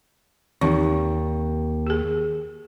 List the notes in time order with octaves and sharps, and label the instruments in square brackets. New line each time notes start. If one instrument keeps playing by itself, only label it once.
[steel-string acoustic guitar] D#2 [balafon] E3 C4 D#4
[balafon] G4 G#4